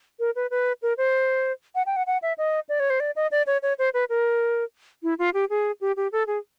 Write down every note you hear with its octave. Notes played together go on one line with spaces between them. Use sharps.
A#4
B4
B4
A#4
C5
F#5
G5
F#5
F#5
E5
D#5
D5
C#5
C5
D5
D#5
D5
C#5
C#5
C5
B4
A#4
E4
F4
G4
G#4
G4
G4
A4
G#4